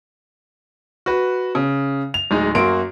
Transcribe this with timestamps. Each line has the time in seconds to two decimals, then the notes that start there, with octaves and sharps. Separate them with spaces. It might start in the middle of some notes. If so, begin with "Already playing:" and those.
1.06 F#4 B4
1.55 C#3
2.14 F7
2.31 D1 G#3 D#4
2.55 F#2 A#3 F#4 C6 D7